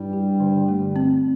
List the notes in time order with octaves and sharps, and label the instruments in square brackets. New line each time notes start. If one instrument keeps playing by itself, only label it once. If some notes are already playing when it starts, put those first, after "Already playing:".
Already playing: [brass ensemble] G2 G3 [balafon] E4
[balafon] G4
D3
A3
C4